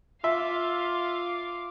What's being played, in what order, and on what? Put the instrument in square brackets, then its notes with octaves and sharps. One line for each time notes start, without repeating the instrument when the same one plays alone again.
[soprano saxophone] F4 [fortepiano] E5 [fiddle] F5 D6